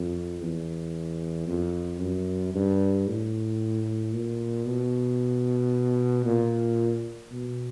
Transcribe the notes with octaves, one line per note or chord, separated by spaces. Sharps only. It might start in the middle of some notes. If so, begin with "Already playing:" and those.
Already playing: F2
E2
F2
F#2
G2
A2
A#2
B2
A#2
B2